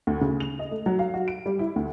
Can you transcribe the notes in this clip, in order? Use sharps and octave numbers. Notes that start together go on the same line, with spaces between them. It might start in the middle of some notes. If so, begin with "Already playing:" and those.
D2
C#3
F7
D#5
A3
F#3
F5
F#4
D7
G3
E4
D2